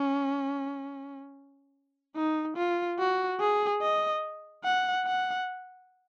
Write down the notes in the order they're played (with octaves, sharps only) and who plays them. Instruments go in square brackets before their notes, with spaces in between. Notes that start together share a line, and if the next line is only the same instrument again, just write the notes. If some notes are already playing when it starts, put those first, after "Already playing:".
Already playing: [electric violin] C#4
D#4
F4
F#4
G#4
D#5
F#5
F#5